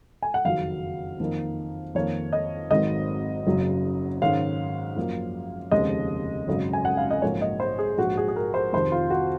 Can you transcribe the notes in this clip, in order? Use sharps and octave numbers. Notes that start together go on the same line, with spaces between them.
G#5
F#5
F#1 F2 D#3 F#3 F5
F2 D#3 A#3 D#4
F2 D#3 A#3 C#5
D#5
G#1 G#2 D#3 F#3 C4 D#5
F#1 F#2 C#3 F#3
G#2 D#3 G#3 C#4 F5
F#2 F3 A#3
F1 D#2 C#3 G#3 C4 D#5
G#1 F#2 C#3 F#3
G#5
F#5
F5
D#5
A#1 G#2 F#3 A#3 C#5
D#5
C5
G#4
A#1 G#2 F3 F#4
G#4
G#4
A#4
C5
F2 C3 D#3 C5
F4
F#4